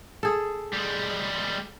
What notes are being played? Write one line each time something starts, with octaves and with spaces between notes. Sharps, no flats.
G#4 A4
G3 G#3